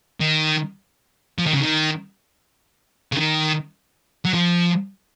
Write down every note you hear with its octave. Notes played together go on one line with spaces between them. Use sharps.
D#3
F3
D#3
C#3
D#3
C#3
D#3
F#3
F3